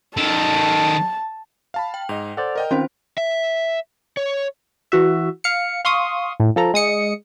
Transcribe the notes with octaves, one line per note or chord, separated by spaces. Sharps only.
D#3 A4 A5
F5 A5 B5
G5
G#2 D#5 F7
A4 C5 D5 F#5
A#4 D#5 G5
D#3 C4 C#4 F4 C5 G5
E5
C#5
E3 F#4 E5
F5 C#7
F5 C6 C#6 D#6
A2
F3 A4 A#5
G#3 D#6 C#7